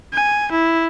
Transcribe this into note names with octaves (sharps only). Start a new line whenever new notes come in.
G#5
E4